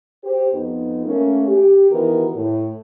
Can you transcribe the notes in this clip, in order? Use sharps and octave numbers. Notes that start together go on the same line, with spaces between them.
G4 C5
F2 B3 D#4
A3 A#3 C#4
G4
D#3 E3 B3 F#4 G4 A#4
A2